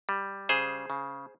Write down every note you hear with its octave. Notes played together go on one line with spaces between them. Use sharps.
G3
C#3 G#4 C5
C#3